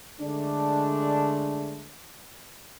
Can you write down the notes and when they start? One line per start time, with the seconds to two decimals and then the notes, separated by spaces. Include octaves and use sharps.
0.20 D3 G#3 A3 D4